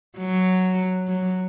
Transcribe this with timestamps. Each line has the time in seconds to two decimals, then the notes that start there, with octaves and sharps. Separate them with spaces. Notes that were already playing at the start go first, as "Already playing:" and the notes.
0.18 F#3
1.08 F#3